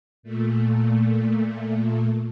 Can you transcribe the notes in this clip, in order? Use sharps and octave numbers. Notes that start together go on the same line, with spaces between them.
A#2 A3